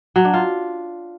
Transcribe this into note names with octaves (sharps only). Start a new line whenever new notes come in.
F#3
D4
F4